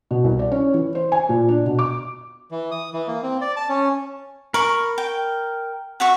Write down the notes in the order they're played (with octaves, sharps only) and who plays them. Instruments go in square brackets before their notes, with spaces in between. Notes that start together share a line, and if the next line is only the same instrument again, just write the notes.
[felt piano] B2
C2
D5
C#4
E3
C5
G#5
A#2
D4
B2
D6
[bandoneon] E3
D#6
E3
A#3
C4
D5
A5
C#4
[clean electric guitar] A#4 [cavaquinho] B5 C#6
[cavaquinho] G5
F#4 E5 C#6